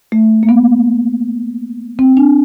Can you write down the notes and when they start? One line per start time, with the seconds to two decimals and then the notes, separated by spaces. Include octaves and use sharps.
0.12 A3
0.43 A#3
0.49 B3
1.99 C4
2.17 D4